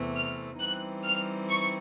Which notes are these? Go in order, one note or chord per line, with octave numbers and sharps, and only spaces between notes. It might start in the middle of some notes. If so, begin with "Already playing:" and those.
Already playing: E2 C3 E3 A3 C4
F6
E3 G3 C4 D#4 F#6
F6
C#6